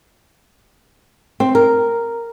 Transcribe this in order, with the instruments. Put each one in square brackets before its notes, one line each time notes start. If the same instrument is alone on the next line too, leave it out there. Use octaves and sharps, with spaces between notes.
[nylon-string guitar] C4
A#4